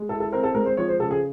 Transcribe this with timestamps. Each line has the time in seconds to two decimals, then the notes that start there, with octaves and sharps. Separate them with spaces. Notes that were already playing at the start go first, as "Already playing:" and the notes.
Already playing: G#3
0.09 E4 A4
0.20 A4
0.32 C4 A#4
0.44 A4
0.54 G#3 A#4
0.66 C5
0.77 F3 C#5
0.88 C5
0.99 C#3 A4
1.11 G#4